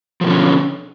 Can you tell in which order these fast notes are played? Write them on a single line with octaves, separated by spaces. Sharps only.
F3 B2 D3 C#4